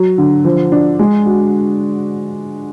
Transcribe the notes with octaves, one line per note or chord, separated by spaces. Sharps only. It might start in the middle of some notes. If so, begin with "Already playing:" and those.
Already playing: F#3
D3
F3
D4
G#3
F#4